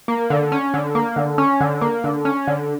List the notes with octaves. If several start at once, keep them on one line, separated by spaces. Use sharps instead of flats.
A#3
D3
C#4
D3
A#3
D3
C#4
D3
A#3
D3
C#4
D3